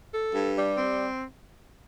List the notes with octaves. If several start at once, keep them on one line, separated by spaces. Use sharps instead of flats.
A4
G2
G3
C4